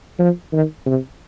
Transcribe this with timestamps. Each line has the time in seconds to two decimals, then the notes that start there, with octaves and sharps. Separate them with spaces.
0.19 F3
0.52 D#3
0.86 C3